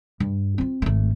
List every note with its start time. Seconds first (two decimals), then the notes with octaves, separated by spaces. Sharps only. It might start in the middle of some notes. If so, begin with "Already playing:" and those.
0.20 G2
0.58 C4 F4
0.82 G#1 A3